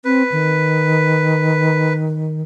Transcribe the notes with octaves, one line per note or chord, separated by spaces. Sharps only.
C4 B4
D#3